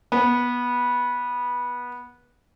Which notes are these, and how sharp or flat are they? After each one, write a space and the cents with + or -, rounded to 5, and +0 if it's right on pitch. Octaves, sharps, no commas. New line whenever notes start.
B3 -15